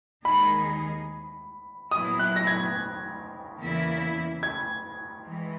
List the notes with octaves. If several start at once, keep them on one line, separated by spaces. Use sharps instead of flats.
D#2 D#3 G#3 D#4 G#4 B5
A#2 F#3 B3 E4 D#6
F#6
A#6
G#6
E2 C#3 E3 A#3 E4
G#6
E3 G#3